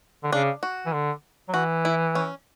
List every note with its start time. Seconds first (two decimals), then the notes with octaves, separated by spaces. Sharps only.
0.24 D3
0.32 C#3 D4
0.63 F#4
0.86 E3
0.93 D3
1.49 F#3
1.54 E3 F#4
1.85 E4
2.15 C#4